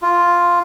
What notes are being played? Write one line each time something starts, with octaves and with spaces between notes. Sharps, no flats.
F4